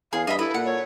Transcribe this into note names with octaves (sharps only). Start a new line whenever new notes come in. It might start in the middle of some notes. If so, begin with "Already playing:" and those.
E2 G#4 F5
G2 D#5 E5 B5
E4 A4 B4
A#2 F#5
C#5